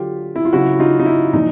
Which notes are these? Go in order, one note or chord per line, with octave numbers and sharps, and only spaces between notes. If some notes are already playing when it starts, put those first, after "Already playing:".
Already playing: D3 F#3 F4 G4
E4
F4
C#3 F#3 E4 F#4
D#4 F4
D#4
E4
A#2 F3 D#4